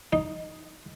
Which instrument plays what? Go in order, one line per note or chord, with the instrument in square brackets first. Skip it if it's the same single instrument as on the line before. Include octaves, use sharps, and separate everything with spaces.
[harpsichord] D#4